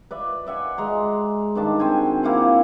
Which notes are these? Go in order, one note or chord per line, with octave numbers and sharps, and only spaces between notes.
B4 D5 E5
D5 E5 F#5 G#5
G#3 A#5 C6
G2 D#3 D4 A5
C4 F#4 C5 G#5
A#3 E4 F5 F#5